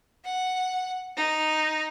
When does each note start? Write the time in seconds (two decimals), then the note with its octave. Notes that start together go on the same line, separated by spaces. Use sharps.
0.24 F#5
1.17 D#4